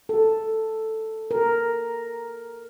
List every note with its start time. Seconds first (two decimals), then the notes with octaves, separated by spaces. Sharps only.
0.09 A4
1.31 A#4